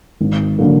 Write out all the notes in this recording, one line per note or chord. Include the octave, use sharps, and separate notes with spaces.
G#1
D3 F#3 A#3